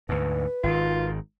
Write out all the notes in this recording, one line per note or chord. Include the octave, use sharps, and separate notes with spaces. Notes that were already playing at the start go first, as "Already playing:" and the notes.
D2 G#2 B4
G#1 D#3 F4